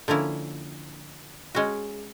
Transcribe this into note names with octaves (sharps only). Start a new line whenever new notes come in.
D3 F3 A#3 C#4 E4
G#3 C#4 F#4